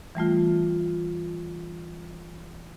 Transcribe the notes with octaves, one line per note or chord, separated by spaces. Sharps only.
E3 G3 A3 F4